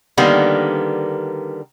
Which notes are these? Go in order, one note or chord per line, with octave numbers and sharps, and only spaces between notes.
D3 D#3 G3 A#3 B3